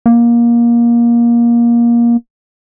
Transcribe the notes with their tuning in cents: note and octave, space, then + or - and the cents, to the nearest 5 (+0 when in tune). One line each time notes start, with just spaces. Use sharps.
A#3 +20